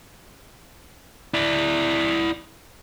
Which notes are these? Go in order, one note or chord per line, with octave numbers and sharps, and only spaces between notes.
E4 D5